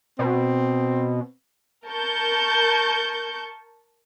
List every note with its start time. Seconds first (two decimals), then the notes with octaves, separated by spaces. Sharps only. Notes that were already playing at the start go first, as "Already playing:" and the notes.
0.19 B2 C4
1.87 A#4 A5 C#6 G6